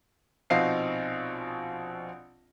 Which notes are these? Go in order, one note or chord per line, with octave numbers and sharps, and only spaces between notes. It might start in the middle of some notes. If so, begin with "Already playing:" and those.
A#1 B2 C4 D#4 F5 C7